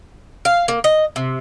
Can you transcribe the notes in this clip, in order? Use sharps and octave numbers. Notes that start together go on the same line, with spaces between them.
F5
A#3
D#5
C3